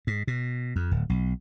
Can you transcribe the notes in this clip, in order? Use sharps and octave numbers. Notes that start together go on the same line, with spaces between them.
G#2
B2
F2
D1
B1